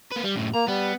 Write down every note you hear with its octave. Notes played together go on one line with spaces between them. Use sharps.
A#3 B4
G3
F#2 A2
A#3 A#5
G3 B3